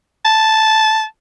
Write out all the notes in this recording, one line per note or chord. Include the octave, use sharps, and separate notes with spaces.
A5